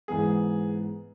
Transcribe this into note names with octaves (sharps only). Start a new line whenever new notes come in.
G#2 E3 B3 G#4